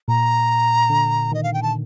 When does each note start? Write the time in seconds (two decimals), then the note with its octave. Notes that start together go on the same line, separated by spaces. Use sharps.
0.08 A#2 A#5
0.89 D3
1.31 D#3 D#5
1.43 F5
1.54 G5
1.63 A5